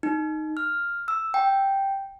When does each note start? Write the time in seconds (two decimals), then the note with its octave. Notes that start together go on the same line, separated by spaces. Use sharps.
0.03 D#4
0.57 F6
1.08 E6
1.34 G5